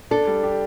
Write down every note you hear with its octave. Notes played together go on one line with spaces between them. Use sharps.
D4 A4
G3
G4